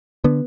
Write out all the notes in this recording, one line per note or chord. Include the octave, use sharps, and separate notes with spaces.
D3 B3